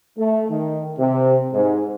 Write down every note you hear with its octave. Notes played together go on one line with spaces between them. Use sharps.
A3
D#3
C3
G#2